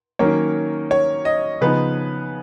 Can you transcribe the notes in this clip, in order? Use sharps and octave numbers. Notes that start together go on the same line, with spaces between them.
D#3 F#3 A#3 C#4 C#5
C#5
D#5
C#3 F3 B3 D#4 B4